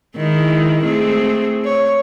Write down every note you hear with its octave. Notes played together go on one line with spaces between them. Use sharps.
D#3 G#3 E4
A3 C4 G#4
C#5